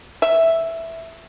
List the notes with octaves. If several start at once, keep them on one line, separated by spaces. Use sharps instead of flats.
E5